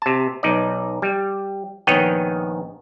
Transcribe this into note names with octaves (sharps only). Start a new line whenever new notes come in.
C3 A5
B1 D#4 D5
G3
A#1 D#3 B3 C#5 D#5 G5